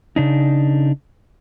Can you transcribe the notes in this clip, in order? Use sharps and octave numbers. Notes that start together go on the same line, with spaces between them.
C#3 D4 D#4